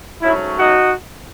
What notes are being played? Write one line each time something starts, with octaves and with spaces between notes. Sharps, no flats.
G#2 F#3 A3 C#4 E4
D#4 F#4